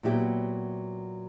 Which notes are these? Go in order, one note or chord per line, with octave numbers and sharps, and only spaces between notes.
A#2 F#3 B3 E4 G4